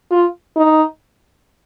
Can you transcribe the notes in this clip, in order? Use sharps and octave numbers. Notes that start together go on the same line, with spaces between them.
F4
D#4